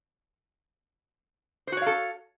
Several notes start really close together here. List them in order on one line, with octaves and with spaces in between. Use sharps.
C5 F#4 C#5 F5 A4